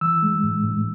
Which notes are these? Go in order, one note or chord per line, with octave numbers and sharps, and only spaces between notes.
E3 E6
G#3
A2
A2